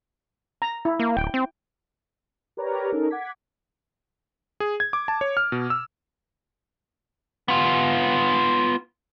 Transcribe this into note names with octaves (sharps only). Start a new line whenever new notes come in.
A#5
E4
A#3
D1 G5
C4
G4 A#4 B4 C#5 D5 A#5
C#4 D#4 A4 A#4
F#5 D6 G#6 B6
G#4
G#6
D6
A5
C#5
F6
B2
E6
B3 F4